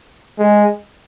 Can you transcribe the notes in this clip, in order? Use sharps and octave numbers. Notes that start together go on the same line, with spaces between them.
G#3